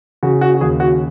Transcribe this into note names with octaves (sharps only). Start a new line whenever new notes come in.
C#3 F#4
F#4
F#4
D#2 G#4
F#4